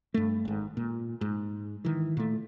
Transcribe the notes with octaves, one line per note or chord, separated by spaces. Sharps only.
G2 A3
G#1 G#2
A#2
G#2
D#3 E3
A#2 A3